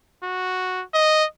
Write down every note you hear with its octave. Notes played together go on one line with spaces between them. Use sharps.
F#4
D#5